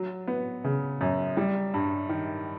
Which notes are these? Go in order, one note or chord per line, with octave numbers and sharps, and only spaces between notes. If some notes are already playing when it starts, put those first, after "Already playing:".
Already playing: F#3
B3
C#3
F#2
G3
G2
D#3